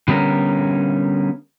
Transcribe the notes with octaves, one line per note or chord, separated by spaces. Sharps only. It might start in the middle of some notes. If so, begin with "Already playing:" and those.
D3 G3 B3 C#4 A#4